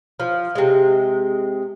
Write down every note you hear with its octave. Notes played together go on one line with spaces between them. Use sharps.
F3
C3 G#3